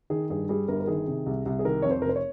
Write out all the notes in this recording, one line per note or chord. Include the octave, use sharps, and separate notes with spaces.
D#3 G#4
G2 G#4
G3 G#4
G1 A#4
A#4
D#3 G#4
C3
C2
C2
G#4
D#3 A#4
F2 C#5
C5
F1 A#4
C5
C#5